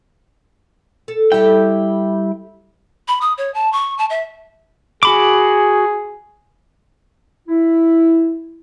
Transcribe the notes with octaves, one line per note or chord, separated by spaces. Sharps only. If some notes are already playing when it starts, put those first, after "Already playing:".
A4
G3 E4 G4 A4 G5
B5
D#6
C#5
A5
C#6
A5
E5
F#4 G#4 B5 D6
E4